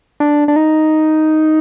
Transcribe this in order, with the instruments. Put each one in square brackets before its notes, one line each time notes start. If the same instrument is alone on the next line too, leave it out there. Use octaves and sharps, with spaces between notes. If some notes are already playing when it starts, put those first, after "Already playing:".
[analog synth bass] D4
D4
D#4